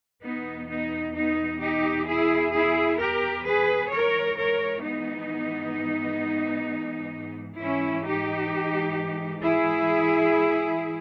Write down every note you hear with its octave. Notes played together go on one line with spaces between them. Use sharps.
E2 B2 B3 D#4
B3 D#4
B3 D#4
D#4 G4
E4 G#4
E4 G#4
G4 A#4
G#4 B4
G#2 E3 A#4 C#5
A#4 C#5
B3 D#4
G#2 E3 C#4 E4
D#4 G4
E4 G#4